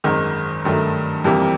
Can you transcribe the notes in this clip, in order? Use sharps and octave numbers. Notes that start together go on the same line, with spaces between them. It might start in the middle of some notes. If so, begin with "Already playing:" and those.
G#1 F#2 D#3 G#3
G2 D#3 F#3 A3
F2 C3 E3 G3 A#3